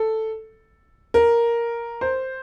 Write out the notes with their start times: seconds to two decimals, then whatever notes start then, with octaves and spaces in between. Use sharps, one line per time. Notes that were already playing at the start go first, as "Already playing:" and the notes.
Already playing: A4
1.14 A#4
2.01 C5